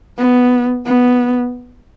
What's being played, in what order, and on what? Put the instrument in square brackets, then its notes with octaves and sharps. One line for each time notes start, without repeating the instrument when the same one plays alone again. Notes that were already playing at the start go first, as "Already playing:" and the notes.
[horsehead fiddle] B3
B3